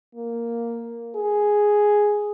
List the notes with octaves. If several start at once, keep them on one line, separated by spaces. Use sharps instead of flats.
A#3
G#4